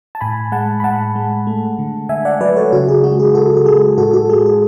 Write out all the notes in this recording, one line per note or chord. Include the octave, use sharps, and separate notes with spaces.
A5
A2 G#5 B5
G#3 F#5 A5
B5
A2 F#5 A5
G#3
A3
D3
D3 E5 G#5
D5 F#5
F#3 B4 D5
A4 C#5
C#3 F#4
G#4
G#3 F#4
G#4
C#3 F#4 A4
A4
G#3 G#4
A2 F#4 A4
F#4 A4
G#3 G#4
G#4